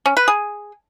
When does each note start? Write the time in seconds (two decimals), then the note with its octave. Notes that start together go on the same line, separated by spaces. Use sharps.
0.06 C#4
0.17 B4
0.28 G#4